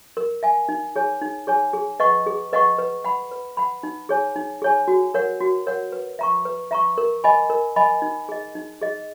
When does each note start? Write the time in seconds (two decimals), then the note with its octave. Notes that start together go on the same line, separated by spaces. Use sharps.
0.17 A#4
0.43 E5 G#5
0.69 D#4
0.96 G#4 C#5 G#5
1.22 D#4
1.47 G#4 C#5 G#5
1.73 G#4
2.00 B4 D#5 F#5 C#6
2.27 G#4
2.53 B4 D#5 F#5 C#6
2.79 B4
3.04 F#5 B5
3.32 B4
3.57 F#5 B5
3.83 D#4
4.09 G#4 C#5 G#5
4.36 D#4
4.62 G#4 C#5 G#5
4.88 F#4
5.14 A#4 C#5 F#5
5.41 F#4
5.67 A#4 C#5 F#5
5.92 B4
6.19 E5 A#5 C#6
6.45 B4
6.71 E5 A#5 C#6
6.98 A#4
7.24 D#5 G#5 B5
7.50 A#4
7.76 D#5 G#5 B5
8.02 D#4
8.29 G#4 D#5
8.55 D#4
8.82 G#4 D#5